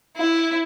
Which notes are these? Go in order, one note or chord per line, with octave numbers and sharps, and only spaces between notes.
E4